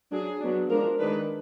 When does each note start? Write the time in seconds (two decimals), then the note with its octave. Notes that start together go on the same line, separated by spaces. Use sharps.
0.11 F#3 D4 G#4
0.40 F#3 B3 D4
0.70 F3 G#3 D4 A#4
1.00 D#3 G#3 D4 B4